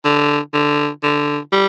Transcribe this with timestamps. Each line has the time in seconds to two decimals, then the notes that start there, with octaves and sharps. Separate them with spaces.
0.05 D3
0.54 D3
1.03 D3
1.53 G3